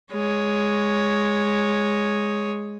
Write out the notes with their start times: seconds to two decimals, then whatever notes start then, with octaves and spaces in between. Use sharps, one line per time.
0.13 G#3 C#5